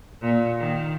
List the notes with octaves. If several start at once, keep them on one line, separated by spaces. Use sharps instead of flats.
A#2
D#3